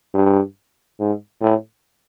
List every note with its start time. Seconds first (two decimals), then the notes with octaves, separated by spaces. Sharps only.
0.15 G2
1.00 G#2
1.41 A2